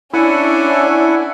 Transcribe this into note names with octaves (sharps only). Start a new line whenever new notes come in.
C#4 D4 E4 A4 F#5 G#5